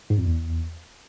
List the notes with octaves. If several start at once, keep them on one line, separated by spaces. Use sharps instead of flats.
G#2
F2
E2